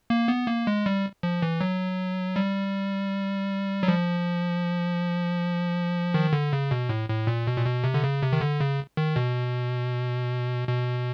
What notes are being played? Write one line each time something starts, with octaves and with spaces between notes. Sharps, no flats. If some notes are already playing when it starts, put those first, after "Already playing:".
A#3
B3
A#3
G#3
G3
F3
E3
F#3
G3
F#3
F3
D#3
D3
C#3
B2
A2
A2
A#2
B2
A#2
B2
C3
D3
C#3
C3
D#3
D3
C#3
D#3
B2
B2